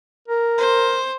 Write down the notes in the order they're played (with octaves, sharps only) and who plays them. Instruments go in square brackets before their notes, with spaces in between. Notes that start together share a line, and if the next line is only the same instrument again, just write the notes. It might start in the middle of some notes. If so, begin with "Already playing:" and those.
[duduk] A#4
[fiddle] C5